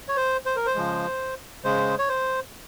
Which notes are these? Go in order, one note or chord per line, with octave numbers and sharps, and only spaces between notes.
C#5
C5
C5
A#4
C5
C#3 F3 G#3
C#3 G#3 C5
C#5
C5